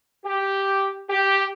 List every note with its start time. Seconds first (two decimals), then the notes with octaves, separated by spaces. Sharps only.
0.25 G4
1.10 G4